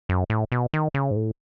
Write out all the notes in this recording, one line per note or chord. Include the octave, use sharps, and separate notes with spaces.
F#2
A2
B2
D#3
C#3
G#2
A2